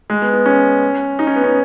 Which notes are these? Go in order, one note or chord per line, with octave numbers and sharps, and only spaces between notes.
G#3
B3
B3
C#4
D#4
C#4
B3
C#4